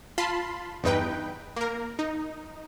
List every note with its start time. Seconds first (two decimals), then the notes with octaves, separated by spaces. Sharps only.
0.18 F4 A5 B5 C6
0.84 E2 G2 D#4 B4 G5
1.56 A#3 A#4
1.99 D#4